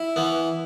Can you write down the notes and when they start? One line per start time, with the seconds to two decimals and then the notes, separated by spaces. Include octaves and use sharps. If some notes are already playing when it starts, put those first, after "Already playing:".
Already playing: E4
0.16 E3 B3